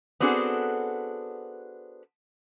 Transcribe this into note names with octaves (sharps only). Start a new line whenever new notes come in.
B3 C4 D4 F#4 G#4 A4